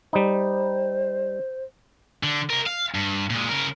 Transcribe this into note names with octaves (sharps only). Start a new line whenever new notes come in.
G3 D#4 C5
D3
C3 A#4
F5
G2
A#2 G#3
C#3 A#4